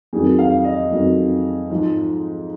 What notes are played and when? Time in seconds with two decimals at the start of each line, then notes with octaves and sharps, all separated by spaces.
0.13 F2 D#3 F#3 G#4
0.39 F5
0.64 D#5
0.91 F2 D#3 F#3
1.70 G#2 F3